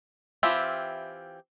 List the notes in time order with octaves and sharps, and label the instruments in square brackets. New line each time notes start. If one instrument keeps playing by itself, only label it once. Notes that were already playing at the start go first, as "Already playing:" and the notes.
[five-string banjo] E3 C4 E4 F4 G4